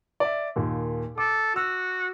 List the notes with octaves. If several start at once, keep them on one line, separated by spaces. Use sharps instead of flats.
D5 E5
D#2 A#2
A4 D6
F#4 E6